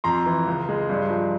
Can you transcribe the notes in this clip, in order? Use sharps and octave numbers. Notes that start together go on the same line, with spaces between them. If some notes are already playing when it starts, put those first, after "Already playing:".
F2 A#5 C6
E3
C#2
G#3
G2
F3